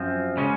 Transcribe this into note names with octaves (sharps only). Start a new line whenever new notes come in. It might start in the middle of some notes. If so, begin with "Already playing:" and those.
Already playing: F#2 F3 C4
C#3 G#3 C#4